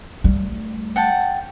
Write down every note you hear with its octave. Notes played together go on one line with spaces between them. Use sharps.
G3 A3
F#5 G5 A5